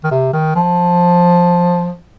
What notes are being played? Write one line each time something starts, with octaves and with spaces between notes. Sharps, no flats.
D#3
C3
D#3
F3